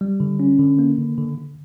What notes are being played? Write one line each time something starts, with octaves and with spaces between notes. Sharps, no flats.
G3
D3
C#4
D3
A#3
D3
D3
D3